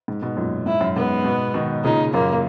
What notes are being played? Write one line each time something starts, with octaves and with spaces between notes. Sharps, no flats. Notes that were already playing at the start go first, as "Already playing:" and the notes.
G#2
G#2 B2
F#2 A#2
G#2 E4
F#2
G#2 B3
G#2 B2
B2 D#3
A#2 C#3 D#4
F#2 A#2 A#3